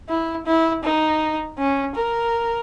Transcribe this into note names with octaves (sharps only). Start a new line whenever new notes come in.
E4
E4
D#4
C#4
A#4